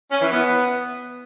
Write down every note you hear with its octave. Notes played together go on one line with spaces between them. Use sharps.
C#4
E3
B3